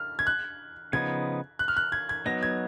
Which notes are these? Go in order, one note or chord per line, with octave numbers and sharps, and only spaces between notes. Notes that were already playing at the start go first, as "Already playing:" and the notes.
Already playing: F6
G#6
F#6
C#3 F3 B3 D#4 G#6
F#6
F6
F#6
G#6
G#6
F#3 B3 D#4 A#6
G#6